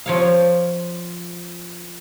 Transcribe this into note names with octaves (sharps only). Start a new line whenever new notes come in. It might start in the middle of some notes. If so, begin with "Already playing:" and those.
F3 C#5 F5